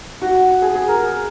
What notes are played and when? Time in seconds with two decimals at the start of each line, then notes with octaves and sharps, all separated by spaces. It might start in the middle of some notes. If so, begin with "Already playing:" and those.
0.22 F#4
0.62 G#4
0.75 G#4
0.88 A#4